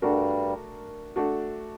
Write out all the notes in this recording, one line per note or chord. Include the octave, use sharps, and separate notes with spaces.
G2 G3 A3 D4 F#4 A#4
A3 D4 F#4